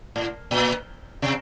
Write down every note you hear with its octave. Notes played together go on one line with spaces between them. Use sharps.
A2
A#2
C3